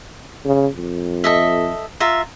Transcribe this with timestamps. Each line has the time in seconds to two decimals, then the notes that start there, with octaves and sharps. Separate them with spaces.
0.45 C#3
0.76 F2
1.24 A4 D#5 E5
2.00 F4 E5 A#5